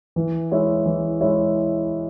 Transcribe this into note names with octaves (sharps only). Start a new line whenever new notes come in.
E3
G#3 E4 C#5 E5
E3
G#3 E4 C#5 E5